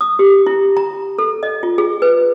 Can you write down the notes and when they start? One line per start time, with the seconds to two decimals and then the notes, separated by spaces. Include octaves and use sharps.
0.01 D#6
0.19 G4
0.46 E4
0.77 A#5
1.19 A4
1.43 D#5
1.63 F4
1.78 G#4
2.02 B4